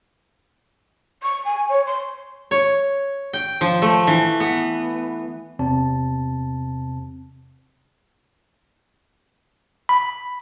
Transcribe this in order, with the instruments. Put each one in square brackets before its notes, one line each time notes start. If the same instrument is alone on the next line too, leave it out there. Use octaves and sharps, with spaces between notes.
[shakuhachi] C#6
G#5
C#5
C6
[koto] C#5
G5
F3
A3
E3
B3
[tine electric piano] E2 C3 C4 A5
B5